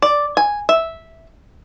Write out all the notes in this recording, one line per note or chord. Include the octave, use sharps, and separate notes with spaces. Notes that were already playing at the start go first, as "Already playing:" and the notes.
D5
G#5
E5